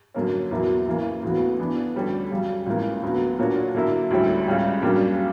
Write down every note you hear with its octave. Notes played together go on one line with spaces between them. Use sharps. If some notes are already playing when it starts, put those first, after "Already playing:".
F#2 D3 A#3 C#4
E2 B2 F#3 A#3 E4
C#3 E3 A#3
D2 C#3 E3 B3 F#4
E3 B3 D4
D2 D3 G3 C#4 G4
F#2 C#3 G3
C#2 C#3 E3 A#3
D2 D3 F#3 B3 F#4
A#2 A#3 D4 F#4 C#5
D3 F#3 A#3 E4
D2 D3 G3 C#4 E4
C#2 C#3 G3
F#2 C#3 G3 A#3 D4